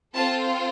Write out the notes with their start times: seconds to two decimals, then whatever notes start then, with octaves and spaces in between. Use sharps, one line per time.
0.15 C4 F4 A4 A5